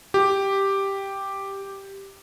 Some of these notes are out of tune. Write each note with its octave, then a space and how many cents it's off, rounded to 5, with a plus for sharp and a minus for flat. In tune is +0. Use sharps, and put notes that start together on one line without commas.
G4 +0